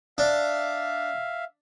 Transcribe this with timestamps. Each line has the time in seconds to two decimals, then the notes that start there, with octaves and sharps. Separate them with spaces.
0.18 D4 E5 F5